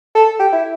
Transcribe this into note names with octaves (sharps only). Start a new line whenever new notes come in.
A4
G4
E4